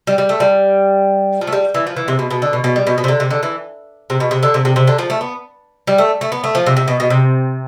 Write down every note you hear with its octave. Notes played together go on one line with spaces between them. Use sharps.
G3
G3
A3
G3
F3
A3
G3
E3
F3
E3
C3
B2
B2
D3
B2
B2
G3
B2
B2
C3
D3
C3
D3
E3
C3
B2
C3
D3
C3
C3
C3
D3
F3
A3
B3
G3
A3
A3
B3
A3
F3
C3
C3
B2
B2
C3